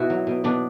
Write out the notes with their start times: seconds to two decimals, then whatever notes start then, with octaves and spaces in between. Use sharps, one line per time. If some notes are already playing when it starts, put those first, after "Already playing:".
Already playing: B2 E4 F#4
0.10 F#3
0.27 B2
0.44 B2 D4